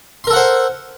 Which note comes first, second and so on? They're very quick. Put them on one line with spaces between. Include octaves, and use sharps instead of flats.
C6 A#4 A4 F#5 C5